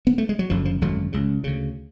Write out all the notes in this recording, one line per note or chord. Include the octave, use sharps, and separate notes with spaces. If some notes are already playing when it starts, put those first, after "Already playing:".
B3
A3
G#3
F#3
F#1 F#2 D3 F3
F3
G#1 F#2 D3 F#3
C#2 C#3
D2 C#3